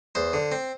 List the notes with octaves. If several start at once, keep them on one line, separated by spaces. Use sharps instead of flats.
E2 C5
D3
C4